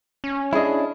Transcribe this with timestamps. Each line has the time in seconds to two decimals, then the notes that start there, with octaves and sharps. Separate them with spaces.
0.24 C#4
0.53 D4 E4 G#4 D#5